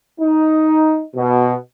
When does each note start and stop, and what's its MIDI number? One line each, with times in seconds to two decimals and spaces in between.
0.20 1.03 63
1.15 1.54 47